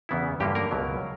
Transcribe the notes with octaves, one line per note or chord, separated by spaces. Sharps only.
E2 C#3 E3 B3 E4
G2 D3 A#3 C#4 G4
A#3 A#4
C#2 B2 F#3